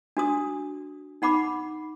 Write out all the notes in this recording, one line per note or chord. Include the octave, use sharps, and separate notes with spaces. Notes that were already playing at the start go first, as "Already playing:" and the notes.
D4 F#4 D#6
D#4 F#5 B5 D6